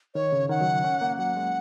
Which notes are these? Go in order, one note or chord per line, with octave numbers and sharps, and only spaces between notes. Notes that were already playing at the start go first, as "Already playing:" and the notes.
D#3 C#5
C#3
D#3 F#5
F#3
C#4
A#3
F#3 F#5
G#3